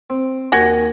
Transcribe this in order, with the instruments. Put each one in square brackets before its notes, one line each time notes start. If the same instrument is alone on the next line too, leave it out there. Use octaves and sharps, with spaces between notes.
[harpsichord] C4
[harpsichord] D#2 D#3 [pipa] F#4 G#5